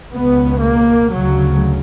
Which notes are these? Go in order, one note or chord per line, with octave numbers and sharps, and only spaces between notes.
C#2 B2 B3
A#3
D2 C#3 F#3